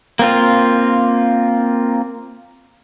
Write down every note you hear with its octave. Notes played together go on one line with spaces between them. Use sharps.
A#3 C4 F4